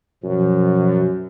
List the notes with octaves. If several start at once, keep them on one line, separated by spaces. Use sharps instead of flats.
F#2 B2 F3